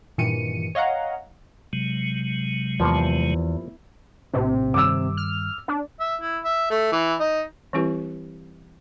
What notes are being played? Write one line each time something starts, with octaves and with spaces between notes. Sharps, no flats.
G2 A#2 D#3 E3 C#7 D#7
C#5 D#5 F5 F#5 A#5
C3 F#3 G#3
E2 F3 G3 A#3
A#1 A2 C3 D4
G2 D#3 G3 D6 E6
F6
D4
E5
E4
E5
A3
E3
D#4
E3 G3 C4 E4 G4 B4